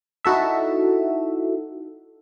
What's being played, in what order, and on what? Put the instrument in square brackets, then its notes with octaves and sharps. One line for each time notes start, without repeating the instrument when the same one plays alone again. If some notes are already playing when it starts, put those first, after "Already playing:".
[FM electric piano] D#4 E4 F#4 A4 E5